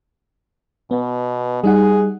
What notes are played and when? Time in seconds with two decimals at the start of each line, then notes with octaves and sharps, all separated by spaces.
0.91 B2 B3
1.64 G3 D#4 G#4 F#5